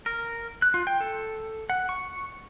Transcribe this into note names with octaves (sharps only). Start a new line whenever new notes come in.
A#4
F#6
F4
G5
A4
F#5
C#6